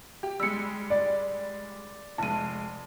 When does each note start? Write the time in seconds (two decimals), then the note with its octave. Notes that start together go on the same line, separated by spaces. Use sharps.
0.23 G4
0.40 G3 G#3 E6 C#7
0.90 D5
2.18 F1 G#3 A5 D#7